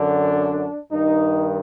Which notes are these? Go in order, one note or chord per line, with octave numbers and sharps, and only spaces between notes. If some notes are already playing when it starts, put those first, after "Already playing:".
Already playing: F#2 D3 D4
G2 D#3 D#4